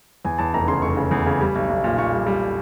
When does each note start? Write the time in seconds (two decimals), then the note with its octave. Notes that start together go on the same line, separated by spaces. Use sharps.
0.25 E2 G#5
0.38 E2 A5
0.54 F1 A#5
0.68 C#3 C6
0.82 F1 C#6
0.97 C#3
1.11 E2
1.26 C#3
1.41 G3
1.55 B1
1.70 B1
1.84 A#2
1.98 A#2 C#6
2.13 G3
2.27 G3